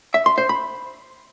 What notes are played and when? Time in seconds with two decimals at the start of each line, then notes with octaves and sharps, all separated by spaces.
0.14 E5
0.26 C6
0.38 C5
0.49 B5